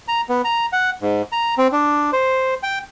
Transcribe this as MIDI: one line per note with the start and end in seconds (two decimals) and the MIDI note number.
0.08 0.21 82
0.29 0.42 59
0.45 0.66 82
0.73 0.90 78
1.02 1.22 44
1.32 1.55 82
1.58 1.68 60
1.72 2.11 62
2.13 2.55 72
2.63 2.79 79